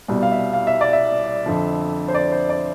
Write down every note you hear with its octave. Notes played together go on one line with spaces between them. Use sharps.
C2 B2 G3
F5
E5
F5
E5
D5
E5
F2 D3 F3
C5
D5
C5
D5